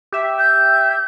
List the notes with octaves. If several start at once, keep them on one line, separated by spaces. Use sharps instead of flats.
G4 E5
G6